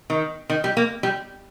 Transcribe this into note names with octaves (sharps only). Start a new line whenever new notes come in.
D#3
D#3
G3
A#3
G3